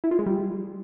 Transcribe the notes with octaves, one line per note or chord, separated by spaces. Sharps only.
E4
F4
G#3
G3